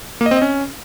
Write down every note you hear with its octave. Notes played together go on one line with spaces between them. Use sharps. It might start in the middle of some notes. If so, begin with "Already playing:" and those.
A#3
D#5
C4
D#5
C#4